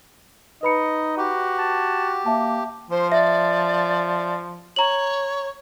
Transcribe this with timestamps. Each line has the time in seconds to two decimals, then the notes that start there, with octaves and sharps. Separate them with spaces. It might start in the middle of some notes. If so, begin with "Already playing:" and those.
0.63 D#4 B4 D#5 B5 C#7
1.18 F#4 G4
1.59 A5
2.26 A#3 E5 A5
2.90 F3 C5
3.12 D5 E5
4.76 C#5 A#5 F#7